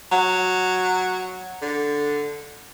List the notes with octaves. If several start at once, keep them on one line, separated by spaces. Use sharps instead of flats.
F#3
D3